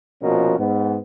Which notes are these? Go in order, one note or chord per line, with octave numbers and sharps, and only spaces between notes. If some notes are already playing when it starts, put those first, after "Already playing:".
A#1 B2 F3 C#4 F#4 A#4
G#2 B3